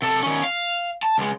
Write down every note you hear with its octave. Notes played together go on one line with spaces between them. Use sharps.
C3 A4
D#3 C#4
F5
A5
C#2 G#3